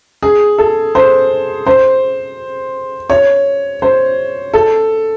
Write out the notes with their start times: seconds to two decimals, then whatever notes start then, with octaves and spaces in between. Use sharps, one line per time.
0.23 G#4
0.58 A4
0.95 C5
1.67 C5
3.10 C#5
3.82 C5
4.53 A4